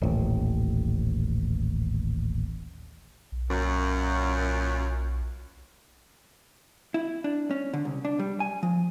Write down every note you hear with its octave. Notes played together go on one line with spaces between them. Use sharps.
D#1 A1
B1
F#2 A#2
E4
D4
C#4
D3
C2
D4
G3
G#5
F3